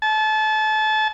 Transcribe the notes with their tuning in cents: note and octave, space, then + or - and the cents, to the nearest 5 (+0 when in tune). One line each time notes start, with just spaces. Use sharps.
A5 -30